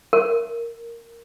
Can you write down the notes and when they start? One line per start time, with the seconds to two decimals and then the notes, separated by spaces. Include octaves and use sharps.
0.13 A#4